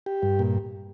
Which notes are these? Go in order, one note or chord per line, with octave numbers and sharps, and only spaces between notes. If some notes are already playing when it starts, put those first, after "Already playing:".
G4
G2
A#2